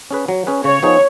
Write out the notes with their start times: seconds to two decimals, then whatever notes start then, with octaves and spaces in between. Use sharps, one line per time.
0.10 C#4 G#4 B4
0.28 F#3
0.47 C#4 G#4 B4
0.64 C#3 C#5
0.83 F3 B3 D#4 G#4